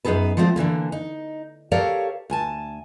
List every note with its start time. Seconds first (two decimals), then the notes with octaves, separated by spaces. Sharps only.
0.05 F#2 B3 D#4 G#4 A4 B4
0.37 F3 G#3 A3 B3 C4 F4
0.56 D3 E3 F3 A#3
0.92 D#4
1.72 G4 A4 A#4 C#5 D5 F5
2.30 D2 G#5 A5